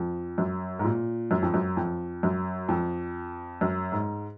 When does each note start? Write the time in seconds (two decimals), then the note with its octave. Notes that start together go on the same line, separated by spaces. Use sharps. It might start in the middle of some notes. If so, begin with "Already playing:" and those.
Already playing: F2
0.38 F#2
0.79 G#2
0.85 A#2
1.31 F#2
1.43 F2
1.54 F#2
1.77 F2
2.23 F#2
2.69 F2
3.61 F#2
3.92 G#2